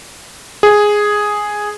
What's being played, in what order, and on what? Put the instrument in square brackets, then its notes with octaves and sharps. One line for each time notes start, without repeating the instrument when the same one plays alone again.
[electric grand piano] G#4